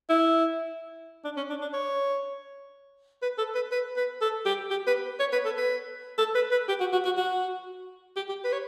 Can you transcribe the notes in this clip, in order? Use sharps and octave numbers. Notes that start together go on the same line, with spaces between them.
E4
D4
C#4
D4
D4
C#5
B4
A4
B4
B4
B4
A4
G4
G4
B4
C#5
B4
A4
B4
A4
B4
B4
G4
F#4
F#4
F#4
F#4
G4
G4
B4
C#5